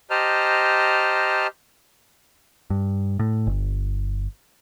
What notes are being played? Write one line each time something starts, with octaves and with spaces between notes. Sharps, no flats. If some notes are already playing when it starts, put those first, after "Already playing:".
G4 C5 D#5 A5 A#5 F6
G2
A2
G1